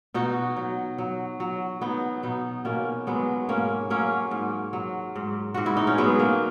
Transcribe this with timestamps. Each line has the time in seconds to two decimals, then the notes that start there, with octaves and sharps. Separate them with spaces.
0.14 B2 D#4 F#4
0.56 F#3
0.98 F#3
1.40 F#3
1.81 F#3 B3 D#4
2.23 B2 B3 D#4
2.65 B2 A#3 C#4
3.07 F#3 G#3 B3
3.49 G#2 A#3 C#4
3.90 F#3 A#3 C#4
4.31 G#2
4.73 F#3
5.16 G#2
5.54 G#2 F#4
5.66 E4
5.77 D#4
5.87 C#4
5.98 F#3 G#3 B3
6.19 A#3